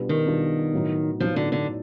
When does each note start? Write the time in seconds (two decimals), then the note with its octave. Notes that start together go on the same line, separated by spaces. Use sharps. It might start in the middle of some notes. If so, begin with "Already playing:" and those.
Already playing: B2 G3 B3 D4 F4
0.09 D#3
0.25 B2 G3 B3 D4 F4
0.73 A2 F#3 B3 D#4
1.20 A2 F3 F#3 B3 D#4
1.36 D3
1.52 D3